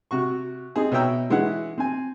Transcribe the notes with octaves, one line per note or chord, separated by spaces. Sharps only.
C3 F#4 C#6
C4 D#4 G#4
B2 C#5 E5 G5 A#5 E6
E3 G#3 C#4 E4 F#5
C4 G#5